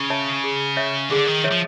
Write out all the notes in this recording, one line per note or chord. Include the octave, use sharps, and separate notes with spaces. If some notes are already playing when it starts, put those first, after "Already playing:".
Already playing: C#3
C#5 E5 A5
G#4
C#5 E5
D3 G#4
D#3
C#5 E5
F3